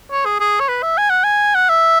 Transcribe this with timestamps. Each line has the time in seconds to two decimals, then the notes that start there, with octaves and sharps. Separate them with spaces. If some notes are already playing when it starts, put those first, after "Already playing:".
0.11 C#5
0.26 G#4
0.40 G#4
0.60 C#5
0.69 B4
0.83 E5
0.98 G#5
1.10 F#5
1.24 G#5
1.55 F#5
1.69 E5